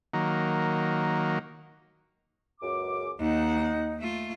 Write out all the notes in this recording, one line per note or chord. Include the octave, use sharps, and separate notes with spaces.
D#3 F#3 A#3
C#2 F#2 D6
D#2 D#4 F#5
A3 F4